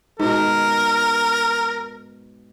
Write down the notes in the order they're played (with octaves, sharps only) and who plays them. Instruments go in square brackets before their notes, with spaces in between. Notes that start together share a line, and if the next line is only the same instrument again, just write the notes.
[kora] G#2 B2 [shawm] A#4